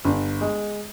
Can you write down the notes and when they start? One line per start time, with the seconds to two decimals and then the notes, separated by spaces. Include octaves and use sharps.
0.04 G1
0.41 G#3